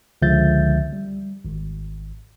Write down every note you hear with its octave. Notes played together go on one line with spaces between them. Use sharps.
C#2 D3 F3 E5 G6 A6
G3
G#1